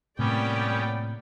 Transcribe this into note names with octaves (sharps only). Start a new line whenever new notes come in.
A2 C3 G3 A#3 B3 C#4 D5 G5